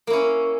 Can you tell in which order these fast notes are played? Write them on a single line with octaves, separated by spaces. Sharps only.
A#3 E4 C#4